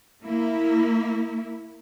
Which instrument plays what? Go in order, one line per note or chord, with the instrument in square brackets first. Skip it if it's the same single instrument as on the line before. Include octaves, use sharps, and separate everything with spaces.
[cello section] A#3 E4